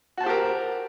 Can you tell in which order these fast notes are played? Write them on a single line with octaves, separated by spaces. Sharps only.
F#4 A5 C5 G4 A#4